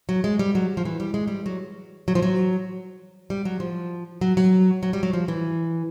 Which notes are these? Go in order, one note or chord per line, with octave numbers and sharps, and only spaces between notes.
F#3
G#3
G3
F#3
F3
E3
G3
G#3
G3
F#3
F#3
F3
F#3
G3
F#3
F3
F#3
F#3
F#3
G3
F#3
F3
E3